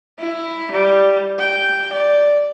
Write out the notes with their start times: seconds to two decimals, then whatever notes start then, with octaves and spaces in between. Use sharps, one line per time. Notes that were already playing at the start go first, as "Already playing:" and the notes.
0.19 E4
0.72 G3
1.39 G5
1.93 D5